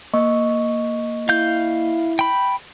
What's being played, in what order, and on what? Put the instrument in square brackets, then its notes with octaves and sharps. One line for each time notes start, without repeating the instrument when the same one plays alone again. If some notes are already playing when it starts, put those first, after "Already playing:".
[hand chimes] A#3 D#5 C#6
[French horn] E4 [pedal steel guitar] F5 G6
[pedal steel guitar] G5 B5